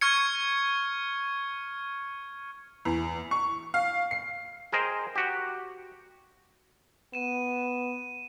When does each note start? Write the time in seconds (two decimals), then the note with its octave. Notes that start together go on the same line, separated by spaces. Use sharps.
0.01 C#6 F6 G#6 C#7
2.85 E2
3.31 C#6
3.74 F5
4.11 C7
4.72 G#4 A#4 C5 D#5 G5
5.16 F#4 G4
7.14 B3 D#7 E7